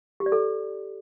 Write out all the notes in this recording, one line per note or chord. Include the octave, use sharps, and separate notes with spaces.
G4
D5
A4